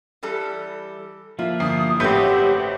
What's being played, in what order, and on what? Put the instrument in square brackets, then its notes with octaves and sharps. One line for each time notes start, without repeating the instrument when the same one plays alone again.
[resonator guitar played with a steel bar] E3 G3 A4
[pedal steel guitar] F3 A#3 E4 [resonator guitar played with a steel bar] F4
[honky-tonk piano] G1 C7 [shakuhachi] D#6
[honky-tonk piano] A1 A3 G6 [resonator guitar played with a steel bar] C4 B4 [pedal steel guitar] F#4 E5 [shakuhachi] G4